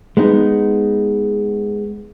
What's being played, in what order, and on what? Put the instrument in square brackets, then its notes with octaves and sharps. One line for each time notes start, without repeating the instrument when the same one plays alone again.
[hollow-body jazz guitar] G#3 B3 D#4